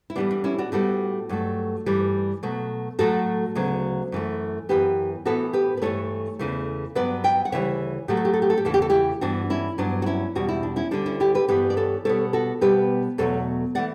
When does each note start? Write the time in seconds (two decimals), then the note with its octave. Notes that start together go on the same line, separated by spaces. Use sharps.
0.10 E4
0.16 A2 E3 G3 B3 D4
0.31 D4
0.44 C#4 E4
0.58 D4 F#4
0.72 A2 G3 B3 F#4 A4
1.29 G2 F#3 A3
1.86 G2 E3 G3
2.43 B2 F#3 A3
2.99 A2 F#3 A3 F#4 A4
3.55 D2 C#3 F#3 B3
4.12 F#2 E3 A3
4.69 F#2 E3 B3 G4 B4
5.25 A2 E3 B3 F#4 A4
5.53 G4 B4
5.77 B4
5.82 G2 E3 A3 A4 C#5
6.39 E2 C#3 E3 A3
6.95 G2 F#3 B3 B4 D5
7.24 E5 G5
7.45 F#5
7.52 D2 C#3 E3 G3 C#5 E5
8.08 A2 F#3 A3 G4
8.17 A4
8.25 G4
8.34 A4
8.42 G4
8.50 A4
8.58 G4
8.65 E2 C#3 E3 A4
8.74 G4
8.82 A4
8.90 E4 G4
9.21 G2 E3 B3 D4 F#4
9.50 C#4 E4
9.78 G2 F#3 B3 D4
10.02 F#4
10.06 C#4 E4
10.35 E2 B2 G3 F#4
10.49 E4
10.63 D4
10.76 C#4 E4
10.91 D2 D3 G3 D4
11.06 C#4 E4
11.20 E4 G4
11.35 G4 B4
11.48 G2 E3 G3 B3 G4 B4
11.70 D5
11.77 A4 C#5
12.05 B2 G3 B3 A4 C#5
12.33 F#4 A4
12.61 B2 G3 B3 G4 B4
13.18 E2 B2 F#3 A3 A4 C#5
13.75 E3 A3 D5 F#5